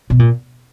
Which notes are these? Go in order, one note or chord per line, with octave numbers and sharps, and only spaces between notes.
B2
A#2